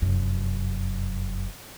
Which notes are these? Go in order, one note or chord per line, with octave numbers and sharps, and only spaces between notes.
F1 F#2